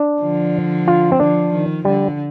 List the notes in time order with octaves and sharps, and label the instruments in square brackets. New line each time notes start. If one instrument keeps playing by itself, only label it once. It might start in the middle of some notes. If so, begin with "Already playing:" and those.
Already playing: [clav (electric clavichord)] D4
[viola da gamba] D3 F3
[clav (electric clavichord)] F4
C4
[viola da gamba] D3 F3 [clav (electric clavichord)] D4
[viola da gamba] D#3
[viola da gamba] D3 [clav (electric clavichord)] G3